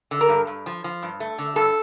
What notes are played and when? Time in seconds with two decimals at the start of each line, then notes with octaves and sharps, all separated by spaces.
0.11 D3
0.21 A#4
0.29 G2
0.47 G2
0.66 F3
0.84 F3
1.03 G2
1.20 A3
1.38 D3
1.56 G2 A4